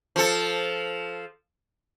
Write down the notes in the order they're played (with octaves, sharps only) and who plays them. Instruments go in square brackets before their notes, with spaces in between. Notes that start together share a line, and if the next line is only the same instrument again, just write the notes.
[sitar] F3 A4